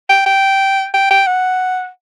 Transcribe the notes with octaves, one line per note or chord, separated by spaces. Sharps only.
G5
G5
G5
G5
F#5